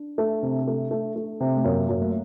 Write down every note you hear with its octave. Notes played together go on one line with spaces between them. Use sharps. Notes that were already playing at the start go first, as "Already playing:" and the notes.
Already playing: D4
A3
C3
A3
A3
A3
C3
A3
F#2 A#3
F#2
A3